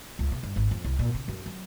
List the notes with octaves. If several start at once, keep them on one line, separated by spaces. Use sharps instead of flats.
C#2
C3
G2
G#1
F2
C2
A#2
C#3
F#2
F#3